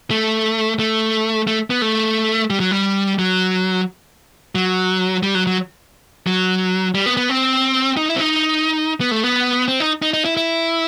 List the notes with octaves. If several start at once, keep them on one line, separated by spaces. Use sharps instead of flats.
A3
A3
A3
B3
A3
G3
F#3
G3
F#3
F#3
G3
F#3
F#3
F#3
G3
B3
B3
C4
D#4
E4
C4
D#4
B3
A3
B3
C4
D#4
D#4
D#4
E4
E4